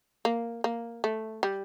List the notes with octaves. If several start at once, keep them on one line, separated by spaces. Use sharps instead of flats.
A#3
A#3
A3
G3